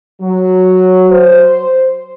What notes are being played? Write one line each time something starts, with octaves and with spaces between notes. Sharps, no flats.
F#3
C5